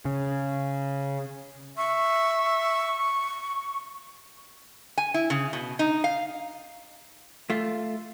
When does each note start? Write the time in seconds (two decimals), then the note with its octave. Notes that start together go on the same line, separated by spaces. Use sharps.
0.05 C#3
1.77 E5 C#6
4.98 G#5
5.14 E4
5.30 C#3
5.53 B2
5.79 D#4
6.04 F5
7.50 A3 F4